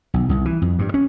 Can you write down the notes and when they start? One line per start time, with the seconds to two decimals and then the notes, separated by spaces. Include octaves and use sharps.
0.14 B1
0.29 C2
0.45 E3
0.62 F2
0.79 G2
0.94 C#4